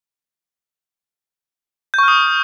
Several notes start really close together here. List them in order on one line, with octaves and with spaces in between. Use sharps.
G6 C#6 F6 D#6